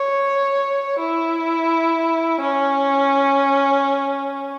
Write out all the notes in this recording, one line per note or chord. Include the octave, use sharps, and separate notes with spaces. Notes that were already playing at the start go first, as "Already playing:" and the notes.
Already playing: C#5
E4
C#4